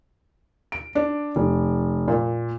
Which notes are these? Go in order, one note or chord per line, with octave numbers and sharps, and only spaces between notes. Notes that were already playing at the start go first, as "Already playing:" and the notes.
D7
D4
F1
A#2